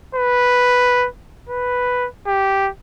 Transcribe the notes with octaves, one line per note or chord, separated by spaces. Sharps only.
B4
B4
G4